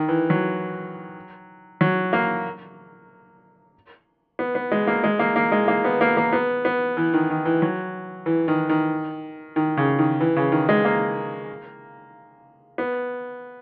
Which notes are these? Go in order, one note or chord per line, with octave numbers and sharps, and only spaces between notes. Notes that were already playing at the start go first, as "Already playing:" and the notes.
Already playing: D#3
E3
F#3
F#3
A#3
B3
B3
G#3
A#3
G#3
A#3
A#3
G#3
A#3
B3
A#3
A#3
B3
B3
E3
D#3
D#3
E3
F#3
E3
D#3
D#3
D#3
C#3
D#3
E3
C#3
D#3
G#3
A#3
B3